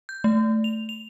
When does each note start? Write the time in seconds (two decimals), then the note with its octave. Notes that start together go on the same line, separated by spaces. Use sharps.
0.09 G6
0.24 A3
0.64 F7
0.89 F7